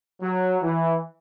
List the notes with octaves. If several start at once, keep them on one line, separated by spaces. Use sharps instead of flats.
F#3
E3